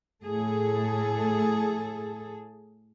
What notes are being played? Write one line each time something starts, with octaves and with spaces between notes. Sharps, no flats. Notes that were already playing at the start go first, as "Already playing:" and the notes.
A2 G#4 A4